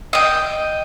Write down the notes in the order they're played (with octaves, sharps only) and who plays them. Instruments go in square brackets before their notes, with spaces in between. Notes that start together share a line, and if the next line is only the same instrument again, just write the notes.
[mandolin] D#5 G5